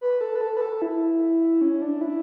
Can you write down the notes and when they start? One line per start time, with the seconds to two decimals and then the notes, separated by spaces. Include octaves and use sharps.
0.01 B4
0.21 A4
0.35 B4
0.41 A4
0.57 B4
0.61 A4
0.82 E4
1.61 C#4
1.82 D4
2.01 E4